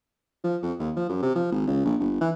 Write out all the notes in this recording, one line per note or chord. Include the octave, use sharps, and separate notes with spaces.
F3
F2
D#2
F3
F#2
C3
F3
G#1
C#2
A#1
G1
E3